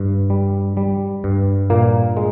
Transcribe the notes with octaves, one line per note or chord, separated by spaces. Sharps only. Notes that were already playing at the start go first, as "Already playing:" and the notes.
Already playing: G2
G3
G3
G2
A#2 A#3
G#3